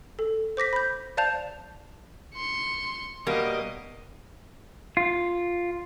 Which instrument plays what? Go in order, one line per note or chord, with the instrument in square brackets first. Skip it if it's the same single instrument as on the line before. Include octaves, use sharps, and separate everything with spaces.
[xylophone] A4
C5 D6 A#6 B6
B5 G6
C5 D5 F5 A5 G6 F7
[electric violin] C6 C#7
[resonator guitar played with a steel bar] B2 G3 A#3 [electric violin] D#5
[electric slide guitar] F4